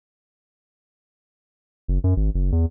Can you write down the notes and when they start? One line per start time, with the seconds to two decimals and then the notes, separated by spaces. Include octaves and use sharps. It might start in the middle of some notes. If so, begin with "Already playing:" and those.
1.88 F#1
2.04 F#2
2.17 G#1
2.35 F#1
2.52 E2